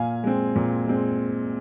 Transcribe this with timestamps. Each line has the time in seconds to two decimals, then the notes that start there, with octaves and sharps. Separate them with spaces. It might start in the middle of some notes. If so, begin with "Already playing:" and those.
Already playing: A#2 F5 G#5
0.24 G#3 C4
0.56 A#2
0.87 G#3 C4